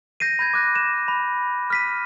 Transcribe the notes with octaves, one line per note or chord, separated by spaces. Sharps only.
G6 A#6 C7 D#7
B5 G6 G#6
D6 F#6 A#6
E7
B5
F6 B6 D#7